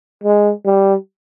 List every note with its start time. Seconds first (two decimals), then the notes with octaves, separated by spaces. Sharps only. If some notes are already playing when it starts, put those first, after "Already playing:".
0.24 G#3
0.65 G3